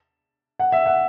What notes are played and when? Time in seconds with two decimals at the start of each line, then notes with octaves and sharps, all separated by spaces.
0.59 F#5
0.72 E5
0.86 F#5